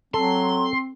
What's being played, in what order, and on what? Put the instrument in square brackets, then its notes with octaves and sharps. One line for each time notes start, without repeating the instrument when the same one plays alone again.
[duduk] F#3 [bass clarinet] C4 [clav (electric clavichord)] A4 [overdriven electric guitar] C6